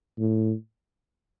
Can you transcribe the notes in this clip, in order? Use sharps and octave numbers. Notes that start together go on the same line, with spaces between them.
A2